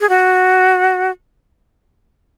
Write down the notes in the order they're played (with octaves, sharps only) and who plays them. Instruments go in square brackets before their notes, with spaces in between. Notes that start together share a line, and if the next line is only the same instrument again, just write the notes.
[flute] G#4
F#4